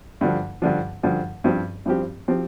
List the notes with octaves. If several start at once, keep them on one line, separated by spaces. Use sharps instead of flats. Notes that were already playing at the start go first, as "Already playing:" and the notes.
G2 D3 F3
G2 D3 F3
G2 D3 F3
G2 F3 C4 G4
G2 F3 C4 G4
F3 C4 G4